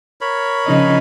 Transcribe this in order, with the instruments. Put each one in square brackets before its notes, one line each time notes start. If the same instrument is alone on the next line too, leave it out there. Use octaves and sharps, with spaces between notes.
[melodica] A#4 C#5 B5
[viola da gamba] C#3 F3 D#4